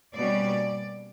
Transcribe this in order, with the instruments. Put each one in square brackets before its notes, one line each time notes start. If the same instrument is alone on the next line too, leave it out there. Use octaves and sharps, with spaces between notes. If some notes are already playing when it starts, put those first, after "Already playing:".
[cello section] B2 G3 A#3 C#4 D5